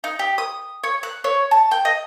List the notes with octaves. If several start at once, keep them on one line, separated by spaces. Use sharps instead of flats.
D#4
G4
D#6
C#5
F#6
C#5
A5
G5
D#5